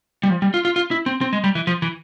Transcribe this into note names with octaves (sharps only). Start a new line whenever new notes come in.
G3
F3
G3
F4
F4
F4
E4
C4
C4
G#3
G3
E3
F3
E3